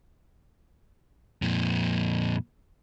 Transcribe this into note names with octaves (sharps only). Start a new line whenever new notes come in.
F2 A#2